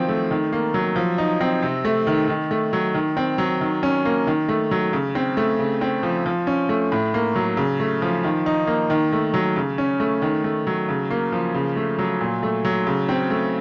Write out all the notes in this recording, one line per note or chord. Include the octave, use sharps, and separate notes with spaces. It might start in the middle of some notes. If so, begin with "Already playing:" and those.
Already playing: D#3 F3 F#3 C4
A3
D#3
A#3
F#3
F3
D#4
C4
C3
A3
D#3
D#3
A3
F#3
D#3
C4
F#3
D#3
C#4
A#3
D#3
A3
F#3
C#3
C4
A3
C#3
C4
F3
F3
C#4
A3
A2
A#3
F#3
C#3
A3
F3
D#3
D#4
A#3
D#3
A3
F#3
C#3
C#4
A3
D#3
A3
F#3
C#3
A#3
F3
C#3
A3
F#3
A#2
A3
F#3
C#3
C4
A3